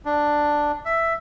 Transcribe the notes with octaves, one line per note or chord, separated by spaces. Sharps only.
D4
E5